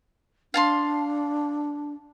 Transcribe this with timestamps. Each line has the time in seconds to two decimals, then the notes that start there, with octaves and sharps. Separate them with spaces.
0.54 D4 F5 A5 C6